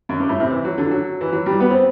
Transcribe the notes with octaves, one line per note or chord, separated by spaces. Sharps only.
F#2
G2
A2
C3
E3
F#3
D3
F#3
E3
F#3
G3
B3
C4